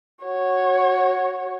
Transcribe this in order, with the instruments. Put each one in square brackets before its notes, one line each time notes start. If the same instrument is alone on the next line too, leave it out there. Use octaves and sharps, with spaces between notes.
[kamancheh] F#4 C#5